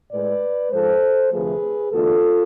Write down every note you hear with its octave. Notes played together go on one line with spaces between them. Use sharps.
A2 G#3 B4 D5
G#2 F3 G#3 A4 C5
D2 C3 F3 A3 G#4 B4
E2 D3 A3 F4 A4